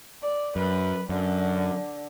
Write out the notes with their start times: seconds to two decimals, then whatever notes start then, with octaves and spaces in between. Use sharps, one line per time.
0.22 D5
0.56 F#2 B4
1.09 F#2 D3